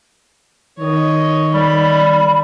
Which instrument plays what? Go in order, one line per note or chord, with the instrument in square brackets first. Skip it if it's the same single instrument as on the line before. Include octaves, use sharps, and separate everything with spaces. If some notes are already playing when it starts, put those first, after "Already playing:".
[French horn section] D#3 [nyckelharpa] C#5 D#5
[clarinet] G3 [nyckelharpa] B5